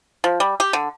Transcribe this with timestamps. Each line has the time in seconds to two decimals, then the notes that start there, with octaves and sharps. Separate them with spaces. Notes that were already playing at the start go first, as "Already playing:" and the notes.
0.24 F3
0.40 G3
0.60 G4
0.73 D3